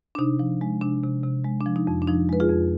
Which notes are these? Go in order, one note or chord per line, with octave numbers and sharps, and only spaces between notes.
D4
C3 D#4
F3
G#3
C3 D4
C3
C3
G#3
D4
F3
D#4
F2
D4
F3 D#4
G#3 B4
F4 G#4
F2